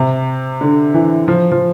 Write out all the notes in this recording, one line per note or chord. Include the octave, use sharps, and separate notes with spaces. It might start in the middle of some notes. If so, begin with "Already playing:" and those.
Already playing: C3
D3
E3
F3
F3